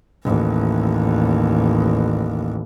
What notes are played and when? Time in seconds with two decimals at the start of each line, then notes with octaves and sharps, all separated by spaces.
0.24 A1 D#2